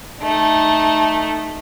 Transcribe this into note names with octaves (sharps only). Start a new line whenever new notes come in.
A3 D#4